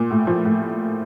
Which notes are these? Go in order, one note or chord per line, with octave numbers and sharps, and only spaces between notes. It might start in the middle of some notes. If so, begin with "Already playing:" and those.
Already playing: A#2
A2
F3
A2